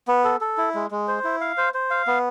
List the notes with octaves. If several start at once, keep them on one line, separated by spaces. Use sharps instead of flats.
B3
A4
A4
E4
G#3
G#3
C5
E4
F5
C5
C5
F5
B3